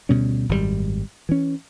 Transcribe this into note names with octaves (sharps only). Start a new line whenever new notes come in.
D2 B2 G3 C#4
G#1 F#2 A2 G3
E3 C#4